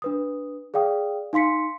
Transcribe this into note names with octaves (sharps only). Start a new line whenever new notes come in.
D4 B4 D#6
G#4 D5 F5 G5 D#6
D#4 F5 C6 B6 C#7